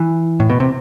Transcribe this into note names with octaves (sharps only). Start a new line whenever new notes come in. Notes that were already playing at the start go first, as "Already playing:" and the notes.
Already playing: E3
A2
B2
C3